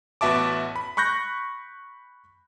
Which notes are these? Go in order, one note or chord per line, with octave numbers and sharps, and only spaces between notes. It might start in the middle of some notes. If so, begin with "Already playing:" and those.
A1 B3 F#4 E5 A5 D6
B5
B5 C#6 F#6 G6 A#6